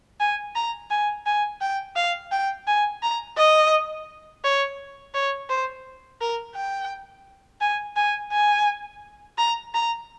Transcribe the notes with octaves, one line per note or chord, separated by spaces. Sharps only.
G#5
A#5
G#5
G#5
G5
F5
G5
G#5
A#5
D#5
C#5
C#5
C5
A#4
G5
G#5
G#5
G#5
A#5
A#5